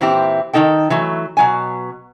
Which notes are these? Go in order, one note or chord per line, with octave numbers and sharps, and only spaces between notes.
A#2 E3 C4 E4 G4
D#3 A3 D#4 A4 G5
E3 F#3 A3
B2 F#3 G#5